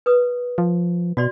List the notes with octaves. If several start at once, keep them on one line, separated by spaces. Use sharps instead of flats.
B4 D#6
F3
B2 F#4 D5 C6